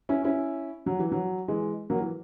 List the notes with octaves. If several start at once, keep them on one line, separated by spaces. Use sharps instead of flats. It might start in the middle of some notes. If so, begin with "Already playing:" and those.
C#4 E4
C#4 E4
F#3
E3
F#3
E3 G#3
F#3 A#3
E3